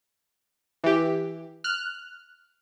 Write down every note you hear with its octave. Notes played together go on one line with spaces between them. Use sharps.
E3 G4
F6 F#6